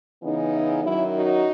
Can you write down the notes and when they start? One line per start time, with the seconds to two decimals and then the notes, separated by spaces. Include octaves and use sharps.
0.22 C#3 E3 B3 D#4
0.52 E4
0.83 F#2 D#3 F#3 E4
1.14 D#4 F#4